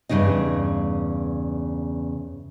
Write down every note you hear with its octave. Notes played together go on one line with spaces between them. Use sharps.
E2 G2 C#3 D#4 D#5